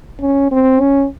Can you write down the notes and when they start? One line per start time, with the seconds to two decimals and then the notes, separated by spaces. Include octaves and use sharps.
0.21 C#4
0.51 C4
0.81 C#4